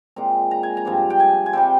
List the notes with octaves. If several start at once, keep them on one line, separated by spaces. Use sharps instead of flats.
A#2 G#3 C4 A#5
A#5
G#5
A#5
G2 F3 C4
G5
G#5
G#5
C3 G3 C4 G5